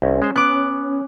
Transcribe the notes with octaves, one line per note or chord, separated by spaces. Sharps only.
C2 C#4
G#3 C5
B3 D6 F#6